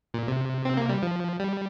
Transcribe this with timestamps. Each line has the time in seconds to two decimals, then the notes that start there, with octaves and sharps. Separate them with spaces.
0.14 A#2
0.28 C3
0.65 C4
0.77 A#3
0.89 G3
1.03 F3
1.40 G3